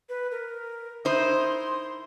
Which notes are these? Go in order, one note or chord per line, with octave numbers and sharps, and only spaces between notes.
B4
A#4
D#4 E4 C5 D#6
C6